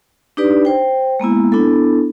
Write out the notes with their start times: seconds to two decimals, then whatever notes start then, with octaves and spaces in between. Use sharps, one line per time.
0.37 D4 D#4 G4 B4 D5
0.65 C5 G5
1.20 G#3 A#3 B3 E4
1.52 B3 D4 E4 A4